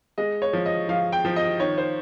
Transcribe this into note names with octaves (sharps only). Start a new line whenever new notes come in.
G#3 D#5
C#5
F3
D#5
F3 F5
G5
F3
D#5
D#3 C#5
C5